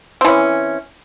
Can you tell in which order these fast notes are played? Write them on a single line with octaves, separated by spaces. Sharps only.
C4 E3 C#4